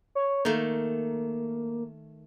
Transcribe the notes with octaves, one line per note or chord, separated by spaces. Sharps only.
C#5
D#3 A3 A#3